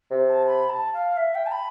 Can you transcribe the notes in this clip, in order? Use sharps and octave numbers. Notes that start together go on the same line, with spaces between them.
C3
A5
B5
A5
F5
E5
G5
A5
B5